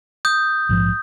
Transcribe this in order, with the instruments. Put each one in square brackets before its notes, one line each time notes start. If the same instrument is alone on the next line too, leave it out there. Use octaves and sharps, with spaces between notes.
[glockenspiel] D#6 G6
[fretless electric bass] A#1 G#2 F3